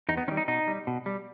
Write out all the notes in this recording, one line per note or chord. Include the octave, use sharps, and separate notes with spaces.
E2 D#4
B3
D#3 G3 C#4
D#4
B2 D#4
G3
B2
G3